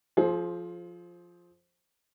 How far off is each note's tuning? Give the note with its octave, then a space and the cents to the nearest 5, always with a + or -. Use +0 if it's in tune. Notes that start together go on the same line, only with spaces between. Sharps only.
F3 +0 G#4 +45 C5 +10